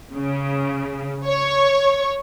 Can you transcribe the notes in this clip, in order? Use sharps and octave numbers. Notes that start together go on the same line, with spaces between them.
C#3
C#5